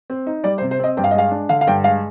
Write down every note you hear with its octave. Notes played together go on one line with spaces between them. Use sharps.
C4
D#4
G3 D5
C5
C3
C5
C4 D#5
G2 G5
F5
D#5
G#3 F5
D4
D3 F5
F5
G2 G5
G#3 F5